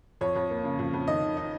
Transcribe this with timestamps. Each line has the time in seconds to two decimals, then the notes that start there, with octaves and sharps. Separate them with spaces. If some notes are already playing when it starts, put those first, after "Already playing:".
0.21 F2 C#5
0.35 F2
0.50 A#3
0.64 C#3
0.79 F2
0.93 F2
1.07 D#3 D#5
1.22 D#3
1.37 D#4